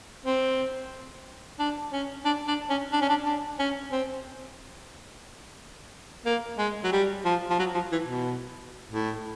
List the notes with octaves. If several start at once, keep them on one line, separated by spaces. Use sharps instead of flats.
C4
D4
C#4
D4
D4
C#4
D4
C#4
D4
D4
C#4
C4
A#3
G#3
F#3
G3
F3
F3
F#3
F3
E3
B2
A2